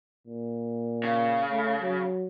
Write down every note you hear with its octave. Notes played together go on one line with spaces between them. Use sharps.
A#2
C#3
A3
F#3